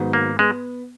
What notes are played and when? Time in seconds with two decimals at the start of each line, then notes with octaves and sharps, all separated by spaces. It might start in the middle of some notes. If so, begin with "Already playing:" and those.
Already playing: G#2 D#3 F#3 B3
0.13 A#3
0.39 G#3 B3